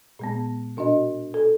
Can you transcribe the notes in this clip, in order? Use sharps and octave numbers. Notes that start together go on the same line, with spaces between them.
A#2 G#3 B3
B2 D4 F#4 D#5
A4